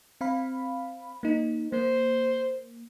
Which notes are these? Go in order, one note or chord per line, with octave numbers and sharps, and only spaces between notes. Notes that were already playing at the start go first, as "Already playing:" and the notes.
C4 F5 B5
A#3 D#4
A#3 C5